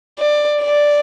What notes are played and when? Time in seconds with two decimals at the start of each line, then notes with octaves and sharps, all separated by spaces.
0.19 D5
0.61 D5